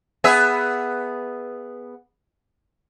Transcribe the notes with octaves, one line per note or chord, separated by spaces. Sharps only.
B3 G#4 E5